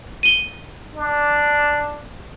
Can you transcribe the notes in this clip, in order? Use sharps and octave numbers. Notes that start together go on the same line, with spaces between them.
D#7 G7
D4